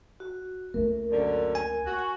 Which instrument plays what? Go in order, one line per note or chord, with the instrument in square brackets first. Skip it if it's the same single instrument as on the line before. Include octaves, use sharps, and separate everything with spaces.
[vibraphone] F#4
[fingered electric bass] C#2 A3 A#3 [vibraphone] A#4
[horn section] F#2 D3
[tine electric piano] G#5
[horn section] F#4